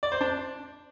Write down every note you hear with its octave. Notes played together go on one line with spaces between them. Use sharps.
D5
C5
D4